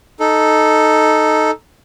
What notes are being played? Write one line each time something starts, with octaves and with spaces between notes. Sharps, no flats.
D#4 A4